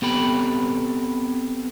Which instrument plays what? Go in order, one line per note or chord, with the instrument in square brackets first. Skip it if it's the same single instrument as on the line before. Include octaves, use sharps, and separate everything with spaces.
[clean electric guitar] B3 C4 G4 A4 G5 B5